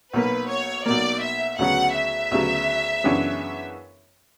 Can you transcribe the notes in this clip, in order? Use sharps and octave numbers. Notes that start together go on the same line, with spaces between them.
B1 B2 A#3 B4
C#5
B1 B2 A#3 D5
E5
D2 C#3 F#3 B3 F#5
E5
D2 C#3 F#3 B3
F#2 C#3 E3 B3 D4